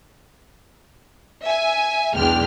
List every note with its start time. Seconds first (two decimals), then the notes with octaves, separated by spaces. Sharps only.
1.45 E5 G#5
2.14 B1 E2 G#3 D4 G5 F6